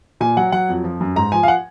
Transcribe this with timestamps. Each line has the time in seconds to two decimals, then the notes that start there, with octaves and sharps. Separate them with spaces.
0.20 A#2 G#5
0.37 F#3 F#5
0.52 F#3 F#5
0.69 F2
0.84 F3
1.01 F#2
1.16 G#2 A#5
1.32 F3 G#5
1.43 F5
1.48 F#5